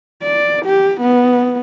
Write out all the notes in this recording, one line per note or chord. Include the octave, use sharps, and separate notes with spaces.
D5
G4
B3